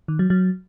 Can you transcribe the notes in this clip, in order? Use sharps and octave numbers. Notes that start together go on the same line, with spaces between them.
D#3
F#3
F#3